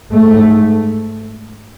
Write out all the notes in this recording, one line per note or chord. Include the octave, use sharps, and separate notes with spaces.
G#2 A3